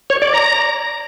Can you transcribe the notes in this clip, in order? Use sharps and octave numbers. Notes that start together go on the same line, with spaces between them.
C#5
D5
A#5